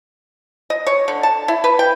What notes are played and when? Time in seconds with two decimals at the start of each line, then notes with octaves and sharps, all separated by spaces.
0.70 D#5
0.87 C#5
1.08 D3
1.23 A5
1.48 E4
1.64 B4
1.79 G5